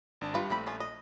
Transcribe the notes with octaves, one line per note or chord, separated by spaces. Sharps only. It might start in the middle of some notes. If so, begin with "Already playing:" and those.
G#1 D4 A5
G2 G3 F4 B4
A#1 E3 A3 C4 B5
F3 C#4 F4
D#5